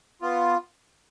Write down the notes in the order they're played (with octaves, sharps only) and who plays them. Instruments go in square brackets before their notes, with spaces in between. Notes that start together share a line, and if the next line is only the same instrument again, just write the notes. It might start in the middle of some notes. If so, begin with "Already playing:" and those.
[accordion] B3 F4